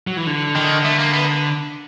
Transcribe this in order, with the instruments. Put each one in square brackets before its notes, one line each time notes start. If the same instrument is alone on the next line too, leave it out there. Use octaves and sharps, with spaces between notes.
[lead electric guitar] F#3
E3
D3
[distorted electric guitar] D#3
A3
A#3
B3